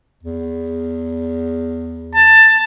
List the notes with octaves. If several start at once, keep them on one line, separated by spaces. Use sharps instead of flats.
E2
A5